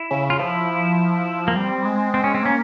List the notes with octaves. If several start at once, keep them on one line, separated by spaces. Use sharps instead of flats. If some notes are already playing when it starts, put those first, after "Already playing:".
Already playing: E4
C#3
F4
F3 E4
A#3
G3 C4
G#3
C4
C#4
C4
A#3 C#4